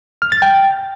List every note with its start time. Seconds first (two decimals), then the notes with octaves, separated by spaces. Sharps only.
0.22 F6
0.32 A6
0.42 G5